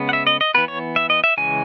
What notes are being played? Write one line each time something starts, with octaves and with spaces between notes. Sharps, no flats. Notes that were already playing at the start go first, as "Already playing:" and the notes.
Already playing: C#3 G#3 B3
F#5
E5
D#5
D#5
E3 B3 B4
C#5
E5
D#5
E5
C#3 E3 G#3 C#4 G#5